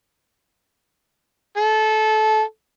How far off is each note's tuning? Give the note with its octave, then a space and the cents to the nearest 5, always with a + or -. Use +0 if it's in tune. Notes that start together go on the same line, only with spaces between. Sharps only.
A4 -20